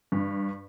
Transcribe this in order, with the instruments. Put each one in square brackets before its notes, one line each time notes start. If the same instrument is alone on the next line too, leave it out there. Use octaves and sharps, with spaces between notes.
[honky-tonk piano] G2